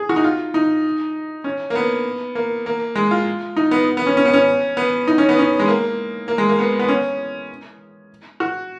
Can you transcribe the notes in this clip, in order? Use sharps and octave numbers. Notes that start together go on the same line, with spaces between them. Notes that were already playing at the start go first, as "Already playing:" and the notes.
Already playing: G#4
F#4
D#4
F4
D#4
C#4
A#3
B3
A#3
A#3
G#3
F4
D#4
B3
B3
C#4
C#4
B3
C#4
B3
D#4
C#4
B3
C#4
G#3
A#3
A#3
G#3
A#3
B3
B3
C#4
F#4